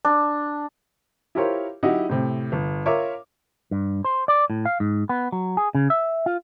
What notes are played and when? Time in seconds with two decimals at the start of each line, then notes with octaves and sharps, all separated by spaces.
0.05 D4
1.35 E4 F4 G4 A#4 C5 C#5
1.83 F#3 D#4 E4 G4 D#5 F#5
2.09 A2 C3
2.52 G1
2.86 F4 A#4 C#5 E5 D6
3.71 G2
4.05 C5
4.28 D5
4.50 A2
4.65 F5
4.80 G#2
5.09 B3
5.32 F#3
5.57 G#4
5.75 C#3
5.90 E5
6.26 F4